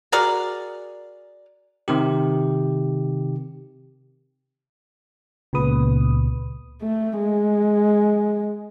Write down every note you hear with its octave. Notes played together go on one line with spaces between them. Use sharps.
F#4 G#4 A#4 D5
C3 D#3 G4
C#2 A#2 C#3 B3 B4 D#6
A3
G#3